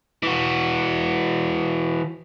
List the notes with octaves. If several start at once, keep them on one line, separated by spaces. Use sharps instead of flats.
E3 F#4